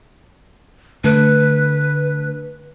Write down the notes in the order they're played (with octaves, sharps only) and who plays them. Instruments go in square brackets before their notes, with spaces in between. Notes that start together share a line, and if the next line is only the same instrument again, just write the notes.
[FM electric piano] D3 A3 [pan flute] B4